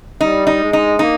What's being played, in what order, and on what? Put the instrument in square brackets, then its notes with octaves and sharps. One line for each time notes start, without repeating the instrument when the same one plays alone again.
[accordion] G3 [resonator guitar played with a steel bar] D#4
[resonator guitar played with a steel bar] D#4
[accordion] G#3
[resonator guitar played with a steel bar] D#4
[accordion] A#3 [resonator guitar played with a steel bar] D#4